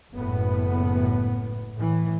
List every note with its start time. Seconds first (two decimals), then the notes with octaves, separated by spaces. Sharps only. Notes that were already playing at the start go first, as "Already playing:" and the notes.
0.14 F#1 A2 B3
1.75 A2 E3